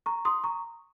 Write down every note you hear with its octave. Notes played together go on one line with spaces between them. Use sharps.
A#5 C#6
C6 D#6
A#5 C#6